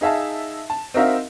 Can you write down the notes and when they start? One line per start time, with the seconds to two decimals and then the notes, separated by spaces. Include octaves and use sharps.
0.01 D#4 G#4 E5 F5 A5
0.70 A5
0.94 C4 D#4 F#4 A#4 E5 F5